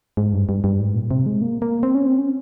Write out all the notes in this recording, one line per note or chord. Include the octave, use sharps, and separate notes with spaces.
G#2
G2
G2
G2
G#2
A#2
C3
G#3
A#3
A#3
C4
C#4
C4
C#4